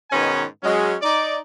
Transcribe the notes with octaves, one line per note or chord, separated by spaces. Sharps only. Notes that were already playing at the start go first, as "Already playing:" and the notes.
G#2 B2 D#3 C#4 B4 G#5
F#3 G#3 C#4
D#4 D5